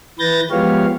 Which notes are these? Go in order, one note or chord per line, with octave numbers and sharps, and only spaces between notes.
E3 B4 G6 A6 A#6
F3 G#3 B3 G4 C#5 F5